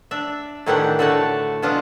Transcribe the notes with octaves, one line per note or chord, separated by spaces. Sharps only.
D4 E5
A2 D#3 E3 D4 G4 F#5
D3 A3 F#4 C#5 A5
B2 E3 D4 F4 D#5 F5